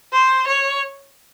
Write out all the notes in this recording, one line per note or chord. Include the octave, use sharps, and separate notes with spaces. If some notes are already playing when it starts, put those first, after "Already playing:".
C5
C#5